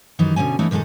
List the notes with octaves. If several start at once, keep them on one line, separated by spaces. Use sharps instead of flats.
F#2 D#3 E3 D#4 G4
D2 B2 D3 C#4 G#5
E3 A3 B3 C#4 D#4 E4
A#2 D#3 G#3 G#4 A4